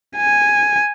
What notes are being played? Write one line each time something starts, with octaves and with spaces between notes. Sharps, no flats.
G#5